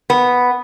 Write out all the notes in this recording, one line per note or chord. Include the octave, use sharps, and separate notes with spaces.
B3